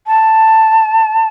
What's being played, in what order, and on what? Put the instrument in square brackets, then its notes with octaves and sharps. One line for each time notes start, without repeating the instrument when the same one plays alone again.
[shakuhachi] A5